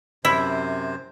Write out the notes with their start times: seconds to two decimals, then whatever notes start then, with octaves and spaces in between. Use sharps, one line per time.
0.25 F#2 C3 E4 C5